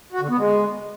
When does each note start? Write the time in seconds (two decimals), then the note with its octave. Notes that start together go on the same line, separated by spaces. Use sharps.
0.12 F#4
0.21 D3
0.29 B3
0.38 G#3